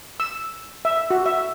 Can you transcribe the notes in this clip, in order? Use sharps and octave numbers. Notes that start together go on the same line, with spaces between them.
E6
E5
F#4
E5